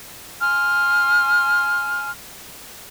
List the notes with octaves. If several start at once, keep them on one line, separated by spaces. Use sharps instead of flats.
G#5 C6 F6